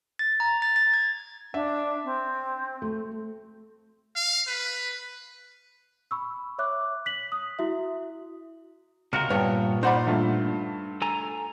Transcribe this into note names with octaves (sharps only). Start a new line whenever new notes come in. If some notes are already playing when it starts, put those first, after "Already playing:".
A6
A#5
A6
A6
G#6
D4 E5
C4
A3
F5
B4
B5 C#6 E6
C#5 E5 D6 F#6
F#6 B6 F#7
D#6
E4 F#4 E5
C#2 C3 F#4 A#4 F6 C#7
G2 A#2 B3 C#5 G5
D#4 C5 D5 F#5 B5
G2 A3 F4
A4 G#5 A#5